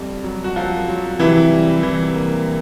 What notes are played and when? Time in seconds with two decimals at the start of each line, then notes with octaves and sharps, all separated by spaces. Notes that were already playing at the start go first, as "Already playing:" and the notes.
Already playing: F2 G3
0.24 F#3
0.44 F#4
0.56 F3 F#3 F4
0.88 F#3
1.19 C3 E3 E4
1.50 G3
1.83 E3
2.14 A#3